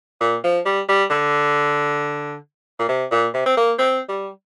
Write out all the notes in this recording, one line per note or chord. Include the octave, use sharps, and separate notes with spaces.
A#2
F3
G3
G3
D3
A#2
C3
A#2
C3
C4
A#3
C4
G3